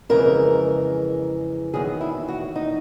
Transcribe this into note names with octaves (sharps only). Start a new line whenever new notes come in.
F2 C#3 E3 G#3 A#4
E2 C3 D#3 F#3 G#4
E4
F#4
D#4